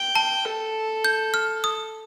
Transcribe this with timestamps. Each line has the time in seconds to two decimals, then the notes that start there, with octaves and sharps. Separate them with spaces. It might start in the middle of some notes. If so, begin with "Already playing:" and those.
Already playing: G5
0.15 A5
0.45 A4
1.05 G6
1.34 F6
1.64 D#6